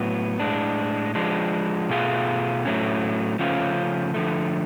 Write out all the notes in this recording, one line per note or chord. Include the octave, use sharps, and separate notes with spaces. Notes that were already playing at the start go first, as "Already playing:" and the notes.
Already playing: A2 F#3 B3
A2 G#3 D4
F3 G#3 D4
B2 A3 F4 G#4
A2 F#3 A3 C#4
C#3 F3 A3 C#4 F4
D3 F3 A3